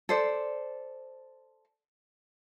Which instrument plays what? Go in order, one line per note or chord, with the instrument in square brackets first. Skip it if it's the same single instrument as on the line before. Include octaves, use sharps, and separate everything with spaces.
[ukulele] A4 C5 D5